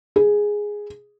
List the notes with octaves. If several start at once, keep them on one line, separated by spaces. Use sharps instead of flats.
G#4